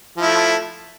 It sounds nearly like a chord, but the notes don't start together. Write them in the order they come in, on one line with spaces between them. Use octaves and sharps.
F3 E4 A3